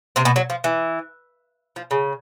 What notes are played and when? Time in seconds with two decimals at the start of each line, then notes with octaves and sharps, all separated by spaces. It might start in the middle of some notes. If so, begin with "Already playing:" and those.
0.16 C3 C4
0.25 B2 B3
0.36 F#3
0.50 F3
0.64 E3
1.76 F3
1.91 C#3